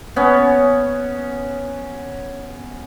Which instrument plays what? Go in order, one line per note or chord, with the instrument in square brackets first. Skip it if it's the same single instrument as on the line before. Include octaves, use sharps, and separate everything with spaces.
[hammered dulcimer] B3 C#4